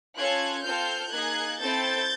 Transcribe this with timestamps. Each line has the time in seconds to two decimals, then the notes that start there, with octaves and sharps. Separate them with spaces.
0.16 C#4 F4 A4 F#6 G#6
0.63 C4 F4 A4 F6 G6
1.11 A#3 D#4 G#4 F#6 G#6
1.59 C4 E4 A4 G6 A6